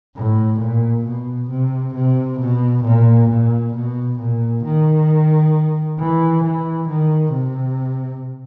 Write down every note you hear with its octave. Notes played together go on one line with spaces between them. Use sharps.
A2
A#2
B2
C3
C3
B2
A#2
A#2
B2
A#2
D#3
E3
E3
D#3
C3